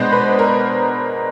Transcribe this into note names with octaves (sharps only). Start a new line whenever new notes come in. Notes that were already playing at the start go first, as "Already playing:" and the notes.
Already playing: B2 G#3 B3 D4 C5
B4
A#4